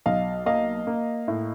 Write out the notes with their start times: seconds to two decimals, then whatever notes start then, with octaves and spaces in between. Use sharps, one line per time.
0.06 B1 D#5 F5
0.46 A#3 D#5 F5
0.87 A#3
1.28 A2